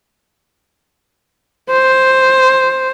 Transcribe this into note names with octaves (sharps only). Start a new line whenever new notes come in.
C5